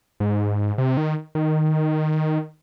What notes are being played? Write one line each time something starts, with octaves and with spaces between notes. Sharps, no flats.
G#2
C3
D#3
D#3